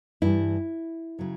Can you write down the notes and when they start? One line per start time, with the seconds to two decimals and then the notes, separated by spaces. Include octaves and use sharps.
0.22 G2 E3 G3 E4
1.19 C#3 F#3